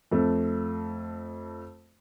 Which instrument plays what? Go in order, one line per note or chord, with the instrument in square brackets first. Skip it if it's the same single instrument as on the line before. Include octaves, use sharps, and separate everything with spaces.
[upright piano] F2 A3